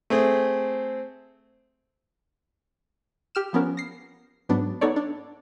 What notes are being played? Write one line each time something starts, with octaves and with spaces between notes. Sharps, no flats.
A3 C4 G#4
G4 F6 E7
F3 B3 C#4 A#4
A#6 C7
G#2 F#3 B3 D4
B3 D#4 A4 C#5 D5
D4